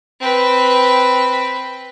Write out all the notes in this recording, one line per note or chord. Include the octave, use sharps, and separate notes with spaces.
C4 B4